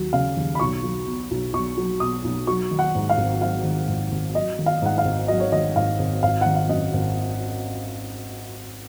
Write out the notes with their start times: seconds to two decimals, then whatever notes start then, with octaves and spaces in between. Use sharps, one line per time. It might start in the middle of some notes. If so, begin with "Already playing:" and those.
Already playing: D#2 F#3
0.13 C#3 F5
0.37 D#2
0.55 B5
0.60 B1 C#6
0.83 F#3
1.07 B2
1.31 B1
1.53 B1 C#6
1.77 F#3
2.00 B2 D#6
2.24 B1
2.47 F#3 C#6
2.71 D#3
2.79 F#5
2.95 G#2
3.09 F5
3.18 G#1
3.41 F#3 F5
3.64 D#3
3.88 G#2
4.12 G#1
4.35 F#3 D#5
4.59 D#3
4.66 F5
4.82 G#2 F#5
4.98 F5
5.05 G#1
5.28 F#3 D#5
5.40 C#5
5.52 D#3 D#5
5.76 G#2 F5
5.99 G#1
6.23 G#1 F5
6.41 D#3 F#5
6.55 F5
6.69 F#2 D#5
6.94 G#1